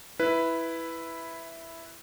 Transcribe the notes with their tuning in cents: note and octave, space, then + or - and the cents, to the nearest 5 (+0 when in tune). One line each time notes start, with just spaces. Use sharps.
E4 +0 B4 +0